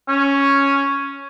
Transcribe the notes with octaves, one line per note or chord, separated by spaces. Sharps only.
C#4